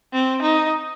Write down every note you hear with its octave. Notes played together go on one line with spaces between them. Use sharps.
C4
D#4